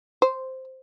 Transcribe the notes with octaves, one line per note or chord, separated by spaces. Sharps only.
C5